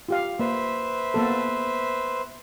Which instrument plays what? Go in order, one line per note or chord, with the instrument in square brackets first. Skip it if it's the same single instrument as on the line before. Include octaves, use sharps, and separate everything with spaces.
[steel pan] F4 G4 F5
[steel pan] A#3 [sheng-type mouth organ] B4 C5 E5
[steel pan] A#3 B3 A4